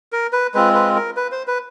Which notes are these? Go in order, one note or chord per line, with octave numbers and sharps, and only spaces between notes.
A#4
B4
G#3 C4 F4 B4
B4
A#4
B4
C5
B4